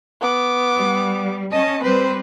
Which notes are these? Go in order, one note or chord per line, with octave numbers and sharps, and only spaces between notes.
B3 D6
G3
C#4 D#5 A5
G3 C4 B4 C5